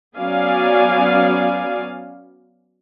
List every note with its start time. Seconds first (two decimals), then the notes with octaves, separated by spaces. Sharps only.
0.17 F#3 B3 C#4 D5 F5 G#5